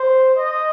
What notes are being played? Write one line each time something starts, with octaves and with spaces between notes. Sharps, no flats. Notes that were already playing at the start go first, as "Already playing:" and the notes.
Already playing: C5
D#5